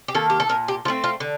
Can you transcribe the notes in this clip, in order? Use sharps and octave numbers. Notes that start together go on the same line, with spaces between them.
G4
D#3 A#3 A4
G4
A4
A#2 A#4
G4
F3 F4
A3 C4
F4
D3